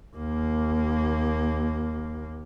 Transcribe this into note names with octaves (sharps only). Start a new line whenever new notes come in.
D#2 A#3